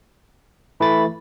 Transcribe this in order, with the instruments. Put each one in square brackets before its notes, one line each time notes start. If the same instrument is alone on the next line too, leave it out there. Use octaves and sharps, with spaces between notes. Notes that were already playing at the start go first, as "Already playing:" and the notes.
[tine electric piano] E3 A3 A6 [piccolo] B5